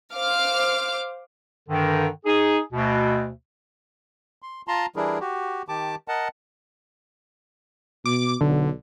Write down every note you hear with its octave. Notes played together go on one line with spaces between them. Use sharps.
C5 F5 D6 F6
G2 D3 D#3
D#4 G#4
D2 B2
C6
F4 A5 A#5 C6
E3 G3 D4 E4 G#4 A#4
F#4 G4
D#3 G4 A5 D6
A#4 D#5 F#5 A5
B2 D6
B1 D3